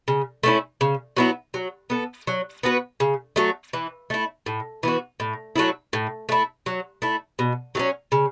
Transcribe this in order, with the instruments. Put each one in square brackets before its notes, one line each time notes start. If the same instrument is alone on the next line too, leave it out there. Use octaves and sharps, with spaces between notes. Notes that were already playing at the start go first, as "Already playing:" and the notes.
[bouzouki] C#3
A3 C#4 E4
C#3
F#3 B3 E4
F#3
B3 A4
F#3
B3 F#4 B4
C#3
F#3 A3
E3
A3 E4
A2
E3 B3 F#4
A2
F#3 A3 E4
A2
A3 E4
F#3
A3 E4
B2
F#3 A3 C#4
C#3